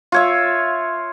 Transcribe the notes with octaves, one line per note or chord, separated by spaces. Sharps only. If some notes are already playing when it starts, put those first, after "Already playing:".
F4 C#5 E5